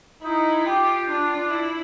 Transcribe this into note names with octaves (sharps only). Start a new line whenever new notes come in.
D#4 E4
F4 G4
D4 F4
D4
E4